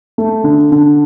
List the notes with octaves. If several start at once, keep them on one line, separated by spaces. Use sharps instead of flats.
A3
D3
D3